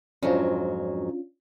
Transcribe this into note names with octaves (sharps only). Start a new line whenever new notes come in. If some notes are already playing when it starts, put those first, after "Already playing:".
F2 G#2 F#3 C#4 D4 F4